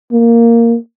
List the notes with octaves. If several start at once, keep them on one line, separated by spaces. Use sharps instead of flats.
A#3